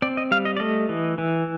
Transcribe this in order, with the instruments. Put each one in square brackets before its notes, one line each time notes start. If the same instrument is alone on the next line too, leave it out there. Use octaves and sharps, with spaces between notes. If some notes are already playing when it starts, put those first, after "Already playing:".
[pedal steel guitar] C4 D5
D#5
G3 F5
D#5
D5
A3 D#5
E3
E3